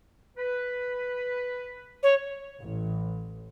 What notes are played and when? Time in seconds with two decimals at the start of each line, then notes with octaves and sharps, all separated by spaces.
0.37 B4
2.03 C#5
2.60 A1